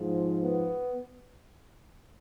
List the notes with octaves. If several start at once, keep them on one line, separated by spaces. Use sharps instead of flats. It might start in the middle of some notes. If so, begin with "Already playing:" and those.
Already playing: G#2 F3
B3